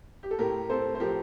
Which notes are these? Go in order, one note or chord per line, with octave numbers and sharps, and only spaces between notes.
G4
A4
A2 G4 A#4
C4 A4 C5
C5
F3 G4 A#4